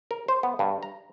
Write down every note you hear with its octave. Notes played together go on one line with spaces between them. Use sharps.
A#4
C5
B3
G2
A#5